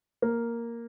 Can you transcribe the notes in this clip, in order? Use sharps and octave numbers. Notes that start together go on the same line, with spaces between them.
A#3